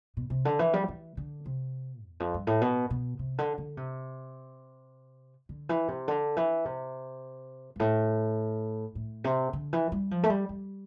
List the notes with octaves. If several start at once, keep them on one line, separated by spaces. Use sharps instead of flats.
B2
C3
D3
E3
G3
E3
D3
C3
E2
F2
G2
A2
B2
B2
C3
D3
D3
C3
D3
E3
C3
D3
E3
C3
G2
A2
A2
C3
D3
E3
G3
F3
A3
G3
G3